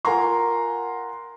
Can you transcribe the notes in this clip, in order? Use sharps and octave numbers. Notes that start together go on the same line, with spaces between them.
F4 A#4 F#5 G#5 A#5 C6